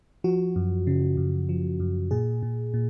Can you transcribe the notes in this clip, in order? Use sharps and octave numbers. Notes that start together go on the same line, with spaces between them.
F3 F#4
F#2
C#3
F#2
F3
F#2
A#2 G#4
A#2
A#2